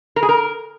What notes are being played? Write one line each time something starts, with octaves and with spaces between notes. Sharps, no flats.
A#4
G#4
A#4